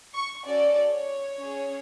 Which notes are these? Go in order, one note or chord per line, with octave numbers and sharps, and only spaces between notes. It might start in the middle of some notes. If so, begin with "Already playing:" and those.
C#6
C#4 F#4 A4 D5
C#5
C#4 G#4